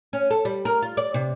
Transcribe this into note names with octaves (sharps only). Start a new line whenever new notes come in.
C#4
A4
G3
A#4
F4
D5
C3